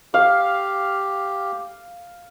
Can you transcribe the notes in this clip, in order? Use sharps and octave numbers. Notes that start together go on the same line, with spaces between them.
G4 F5